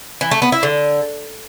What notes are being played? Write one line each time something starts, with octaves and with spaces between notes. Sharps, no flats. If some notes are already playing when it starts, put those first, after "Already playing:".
E3
A3
B3
E4
D3